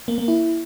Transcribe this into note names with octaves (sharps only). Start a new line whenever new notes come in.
A#3
A#3
E4